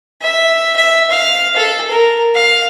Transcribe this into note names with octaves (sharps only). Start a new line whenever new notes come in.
E5
E5
F5
A4
A#4
F5